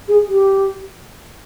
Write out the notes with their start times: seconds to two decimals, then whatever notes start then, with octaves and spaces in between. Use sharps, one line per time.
0.08 G#4
0.28 G4